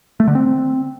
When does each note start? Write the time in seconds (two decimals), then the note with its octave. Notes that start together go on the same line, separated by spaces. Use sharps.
0.20 A3
0.27 D3
0.35 C4